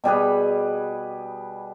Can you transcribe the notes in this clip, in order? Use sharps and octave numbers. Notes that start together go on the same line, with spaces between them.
B2 G3 G#4 B4